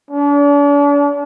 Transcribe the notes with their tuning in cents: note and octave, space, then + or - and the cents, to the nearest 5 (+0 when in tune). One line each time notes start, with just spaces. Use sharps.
D4 -40